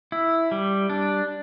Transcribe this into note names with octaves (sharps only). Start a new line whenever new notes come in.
E4
G3
D4